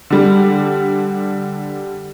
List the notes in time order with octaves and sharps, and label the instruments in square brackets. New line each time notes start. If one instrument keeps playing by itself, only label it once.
[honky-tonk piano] D3 G3